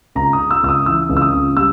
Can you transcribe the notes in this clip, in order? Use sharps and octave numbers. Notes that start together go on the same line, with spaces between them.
C#2 A#5
D#6
C#3
E6
C#2 E6
D#6
E3 E6
C#2
E6
D#6
C#2
G3 E6